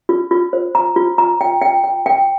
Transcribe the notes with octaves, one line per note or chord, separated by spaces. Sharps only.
F4
F4
C5
A#5
F4
A#5
G5
G5
G5
G5